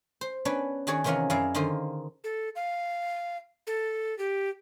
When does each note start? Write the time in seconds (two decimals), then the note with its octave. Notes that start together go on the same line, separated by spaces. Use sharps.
0.21 C5
0.45 B3 C#4 D4 B4 C#5
0.87 D#3 D4 F#4 G#4 C#5 D5
1.04 C3 D#3 E3 C#4 F4 A#4
1.30 F#2 E4 G#4 D5 F5 A#5
1.55 D3 D#3 D#4 F4 C5
2.24 A4
2.56 F5
3.67 A4
4.19 G4